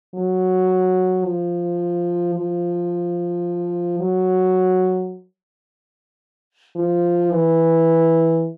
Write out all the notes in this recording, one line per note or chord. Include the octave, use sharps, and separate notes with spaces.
F#3
F3
F3
F#3
F3
E3